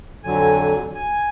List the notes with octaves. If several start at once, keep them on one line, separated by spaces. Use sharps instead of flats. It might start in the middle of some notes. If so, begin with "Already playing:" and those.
F2 D3 F#3 G#5
G#5